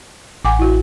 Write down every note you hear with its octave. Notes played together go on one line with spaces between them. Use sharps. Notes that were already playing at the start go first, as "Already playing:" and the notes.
A1 F#5 G#5 D6
E4 F#4